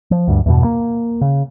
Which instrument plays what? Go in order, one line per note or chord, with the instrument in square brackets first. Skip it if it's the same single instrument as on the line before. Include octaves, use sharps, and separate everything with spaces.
[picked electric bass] F3
D2 G2
E2 G2 B2
A#3
C#3